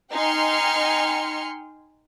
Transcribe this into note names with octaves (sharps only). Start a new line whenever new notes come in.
D#4 G5 G#5 C6 F6 C#7